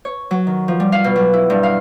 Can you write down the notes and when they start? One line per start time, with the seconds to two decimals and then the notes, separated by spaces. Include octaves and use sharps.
0.05 C#5
0.31 F#3
0.47 D#3
0.68 F3
0.80 G3
0.92 F5
1.04 B2
1.16 F#3
1.33 E4
1.50 G2
1.63 F5